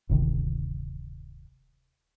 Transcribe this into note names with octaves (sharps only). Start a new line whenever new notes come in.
D1 G1 C3 D#3